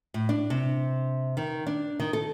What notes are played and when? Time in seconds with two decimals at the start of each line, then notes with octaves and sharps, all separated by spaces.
0.14 A2
0.29 D4
0.50 C3
1.37 D#3
1.67 D4
2.00 D#3
2.13 A4